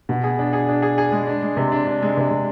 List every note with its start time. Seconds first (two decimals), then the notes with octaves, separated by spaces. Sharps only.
0.09 B2
0.23 G#4
0.39 D4
0.53 G#4
0.69 D4
0.82 G#4
0.98 G#4
1.12 G#3
1.27 D4
1.43 G#3
1.57 C3
1.72 D4
1.87 D4
2.02 G#3
2.17 C3
2.31 C3